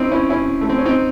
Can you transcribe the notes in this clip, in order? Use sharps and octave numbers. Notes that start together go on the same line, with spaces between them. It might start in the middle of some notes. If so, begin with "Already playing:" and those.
Already playing: C4 C#4 D#4 E4
C#4 E4
C#4 E4
A3
C4
C#4
C4 D#4